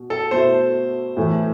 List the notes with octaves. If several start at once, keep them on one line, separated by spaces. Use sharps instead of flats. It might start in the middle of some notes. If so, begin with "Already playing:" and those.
Already playing: B2
A4
B2 A3 E4 C5
A2 E3 A3